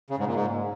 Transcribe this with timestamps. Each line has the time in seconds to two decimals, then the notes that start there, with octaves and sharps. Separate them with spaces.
0.10 C#3
0.18 G#2
0.27 A#2
0.35 G#2